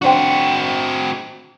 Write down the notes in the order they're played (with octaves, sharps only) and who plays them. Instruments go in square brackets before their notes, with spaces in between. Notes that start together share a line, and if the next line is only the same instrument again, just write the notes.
[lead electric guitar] C4 F#4 [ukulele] D4 C5 G5